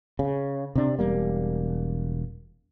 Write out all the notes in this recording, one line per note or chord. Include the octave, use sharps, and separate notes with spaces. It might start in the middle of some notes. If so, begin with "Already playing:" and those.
C#3
C3 D4
E1 G3 A#3